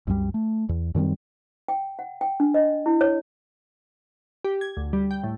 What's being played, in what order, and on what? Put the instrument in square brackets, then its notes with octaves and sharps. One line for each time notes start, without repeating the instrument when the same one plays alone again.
[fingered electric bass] C2 F#2 F3 G3
A3
E2
F#2 D#3 G3 C4
[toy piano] G5
F#5
G5
D4
D#5
E4
C#5
[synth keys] G4
G#6
D2
G3
G5
A2